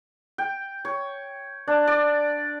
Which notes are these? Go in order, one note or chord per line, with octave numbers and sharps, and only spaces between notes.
G5
C#5
D4
D5